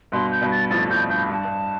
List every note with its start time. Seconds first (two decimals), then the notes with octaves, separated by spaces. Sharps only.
0.12 G2 B2 C6
0.32 G6
0.42 G2 B2
0.51 A6
0.71 F2 A2 A6
0.90 F2 G6
1.10 G2 G6
1.29 G2 A5
1.45 G2